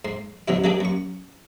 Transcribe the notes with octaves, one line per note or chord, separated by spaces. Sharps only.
G#2 C6
C#2 B2 F#3 E4
F#3 G3 A#3 D4 G4 G#4
F#2 C#6